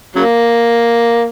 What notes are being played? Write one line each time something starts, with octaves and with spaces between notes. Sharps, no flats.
C#3 F#3 A#3